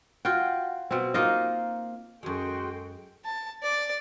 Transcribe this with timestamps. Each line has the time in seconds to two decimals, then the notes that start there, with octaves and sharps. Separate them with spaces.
0.25 F4 F#4 G5
0.91 B2 C4
1.14 A#3 D#4 F4 D#5
2.23 F#2 G#3 F#4 G#4 A4 G5 C6 C#6
3.25 A5
3.63 D5